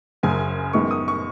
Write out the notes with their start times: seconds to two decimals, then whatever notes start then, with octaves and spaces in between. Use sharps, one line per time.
0.23 F#1 F#2 C#3 G#5
0.73 F#2 D#3 G#3 B3 C#6
0.91 D#6
1.08 C#6